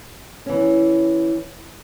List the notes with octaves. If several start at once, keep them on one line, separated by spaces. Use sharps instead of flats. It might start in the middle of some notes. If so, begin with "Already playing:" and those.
E3 C#4